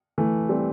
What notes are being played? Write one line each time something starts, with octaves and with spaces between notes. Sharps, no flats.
E3 A3
G3 C4